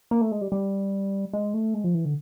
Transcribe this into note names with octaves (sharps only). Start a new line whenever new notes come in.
A#3
A3
G#3
G3
G3
G#3
A3
G#3
F3
E3
D3